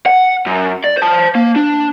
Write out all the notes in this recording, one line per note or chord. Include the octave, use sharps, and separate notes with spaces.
F#5
F#2
D5
C5 A5
A#3
D4